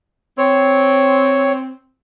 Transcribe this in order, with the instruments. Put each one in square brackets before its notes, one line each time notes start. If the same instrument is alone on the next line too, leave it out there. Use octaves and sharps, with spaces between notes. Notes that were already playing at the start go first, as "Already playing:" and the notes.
[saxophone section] C4 [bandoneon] C#5